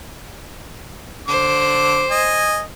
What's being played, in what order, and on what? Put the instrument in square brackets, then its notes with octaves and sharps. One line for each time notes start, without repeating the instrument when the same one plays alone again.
[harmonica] D3 D6 [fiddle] C5
[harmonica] D#5 G#5